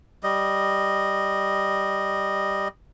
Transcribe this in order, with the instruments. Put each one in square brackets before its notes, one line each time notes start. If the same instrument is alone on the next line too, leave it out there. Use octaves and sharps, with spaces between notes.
[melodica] G3 D#5